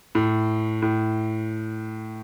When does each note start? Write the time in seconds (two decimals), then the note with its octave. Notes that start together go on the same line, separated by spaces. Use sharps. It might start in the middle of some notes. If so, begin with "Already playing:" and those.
0.15 A2
0.82 A2